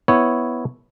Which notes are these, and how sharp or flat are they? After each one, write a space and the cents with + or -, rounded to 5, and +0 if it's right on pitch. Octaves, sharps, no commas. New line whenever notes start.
B3 +0 E4 +0 C#5 +0